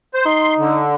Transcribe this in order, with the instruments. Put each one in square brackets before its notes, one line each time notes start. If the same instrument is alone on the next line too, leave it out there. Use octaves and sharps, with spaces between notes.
[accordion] C5
[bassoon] D#4 [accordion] C6
[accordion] D3